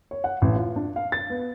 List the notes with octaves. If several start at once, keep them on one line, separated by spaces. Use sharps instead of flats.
C#5
F#5
A1
F4
D4
F5
A6
B3